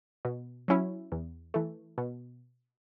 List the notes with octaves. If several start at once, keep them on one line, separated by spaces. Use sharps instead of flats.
B2
F#3 C#4 E4
E2
E3 A3
B2